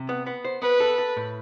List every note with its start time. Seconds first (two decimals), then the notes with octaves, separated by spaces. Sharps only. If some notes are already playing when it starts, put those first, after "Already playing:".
Already playing: C3
0.09 B3
0.26 B3
0.45 C5
0.62 B3 B4
0.80 A4
0.98 A4
1.17 A2